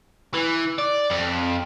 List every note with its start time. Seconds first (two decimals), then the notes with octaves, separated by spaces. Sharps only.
0.34 E3
0.78 D5
1.10 F2